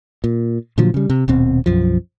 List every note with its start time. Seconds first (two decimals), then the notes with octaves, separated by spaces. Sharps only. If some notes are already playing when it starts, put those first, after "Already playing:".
0.24 A#2
0.78 A#2 D3 F3 F#3
0.94 C#3 G3
1.10 C3
1.28 D#1 B2 C4
1.66 B1 F#2 F3